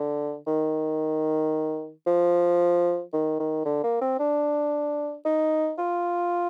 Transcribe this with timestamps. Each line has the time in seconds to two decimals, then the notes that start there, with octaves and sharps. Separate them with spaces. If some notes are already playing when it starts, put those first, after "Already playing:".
Already playing: D3
0.47 D#3
2.07 F3
3.13 D#3
3.40 D#3
3.66 D3
3.84 A#3
4.02 C4
4.19 D4
5.25 D#4
5.79 F4